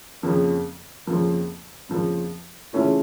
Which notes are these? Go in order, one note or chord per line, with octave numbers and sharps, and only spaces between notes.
F2 C#3 F3 A#3
F2 C#3 F3 A#3
F2 C#3 F3 A#3
C#3 E3 A3 C#4 F4